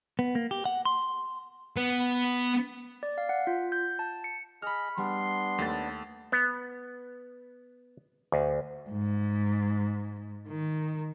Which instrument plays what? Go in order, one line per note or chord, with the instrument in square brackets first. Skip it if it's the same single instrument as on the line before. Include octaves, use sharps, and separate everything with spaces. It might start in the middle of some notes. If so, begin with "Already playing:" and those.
[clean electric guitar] B3
A#3
G4
F#5
C6
[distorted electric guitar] B3
[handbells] D5
F5
F#5
F4
G6
A5
C#7
[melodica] G#4 D#5 [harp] B5 F6
[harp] G3 [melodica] B3 D4 [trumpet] C6
[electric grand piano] D#2 A6 [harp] A3
[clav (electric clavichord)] B3
D2
[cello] G#2
D#3